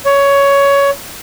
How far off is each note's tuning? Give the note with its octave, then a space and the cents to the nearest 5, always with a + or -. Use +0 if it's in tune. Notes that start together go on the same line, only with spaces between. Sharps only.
C#5 +15